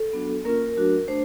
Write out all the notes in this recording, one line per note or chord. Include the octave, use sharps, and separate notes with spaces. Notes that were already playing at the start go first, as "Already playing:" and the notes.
Already playing: A4
F#3 B3 D4 F#4
A#3 C#4 F4 A#4
F#3 A3 D4 F#4
A3 D4 C5